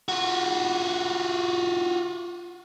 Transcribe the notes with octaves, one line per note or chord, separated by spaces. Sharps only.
F4 F#4